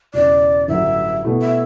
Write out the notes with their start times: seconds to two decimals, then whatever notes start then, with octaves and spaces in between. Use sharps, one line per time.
0.14 E1 E2 C#3 D5
0.68 A1 G2 D3 F#3 E5
1.23 B2 A3 E4
1.42 E5